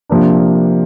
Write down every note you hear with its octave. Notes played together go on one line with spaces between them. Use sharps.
C3 F3 A#3 D4